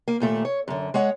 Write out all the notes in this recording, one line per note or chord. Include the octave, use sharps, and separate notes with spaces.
A#3
D#2 A#2 A3
C#5
F#2 D3
G#3 C#5 F#5